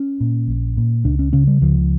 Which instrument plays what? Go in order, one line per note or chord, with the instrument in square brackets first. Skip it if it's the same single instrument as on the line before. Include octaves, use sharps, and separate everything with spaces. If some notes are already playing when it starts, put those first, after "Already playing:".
Already playing: [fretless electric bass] C#4
A#2
A#1
A#2
C#2 D4
C#4
C#3 C#4
G3
C#2 F3